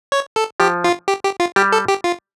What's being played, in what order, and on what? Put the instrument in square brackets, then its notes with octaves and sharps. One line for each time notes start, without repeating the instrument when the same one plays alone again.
[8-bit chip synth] C#5
A4
[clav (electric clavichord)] F3 [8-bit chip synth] G4
[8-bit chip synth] F4
G4
G4
F4
[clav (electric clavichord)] G3 [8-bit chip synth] G4
[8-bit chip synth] A4
G4
F4